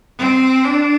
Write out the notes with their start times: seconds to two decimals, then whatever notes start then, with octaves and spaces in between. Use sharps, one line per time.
0.19 C4
0.64 D4